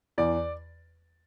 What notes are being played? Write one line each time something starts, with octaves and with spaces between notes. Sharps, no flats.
E2 D5